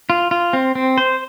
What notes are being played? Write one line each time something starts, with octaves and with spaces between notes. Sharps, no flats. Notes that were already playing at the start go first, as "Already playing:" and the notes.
F4
F4
C4
C4
C5